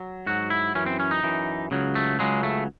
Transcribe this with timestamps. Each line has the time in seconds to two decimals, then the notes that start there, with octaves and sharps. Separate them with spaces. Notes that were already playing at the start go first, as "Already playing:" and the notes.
Already playing: F#3
0.27 G#2 F#3 F#4
0.50 E4
0.75 F#2 E3 C#4
0.86 C4
1.00 C#4
1.11 D#4
1.23 F#2 E3
1.71 C#2 C#3 F#3
1.95 A3
2.19 C#2 C#3 F#3 G#3
2.43 A3